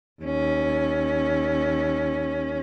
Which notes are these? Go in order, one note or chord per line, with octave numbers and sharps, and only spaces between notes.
D#2 C#4